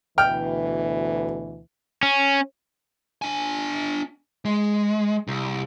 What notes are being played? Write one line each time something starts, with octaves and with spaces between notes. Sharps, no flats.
D2 B2 E3 G5 F6
C#4
D4 G#5
G#3
C2